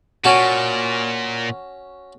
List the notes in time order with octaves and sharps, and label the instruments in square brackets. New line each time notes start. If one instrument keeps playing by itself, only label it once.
[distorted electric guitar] A#2 [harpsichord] C#4 F#4 A5